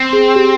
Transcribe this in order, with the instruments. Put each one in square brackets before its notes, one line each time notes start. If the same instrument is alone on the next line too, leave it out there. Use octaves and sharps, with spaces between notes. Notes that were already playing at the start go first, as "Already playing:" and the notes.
Already playing: [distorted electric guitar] C4
[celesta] G#4
G4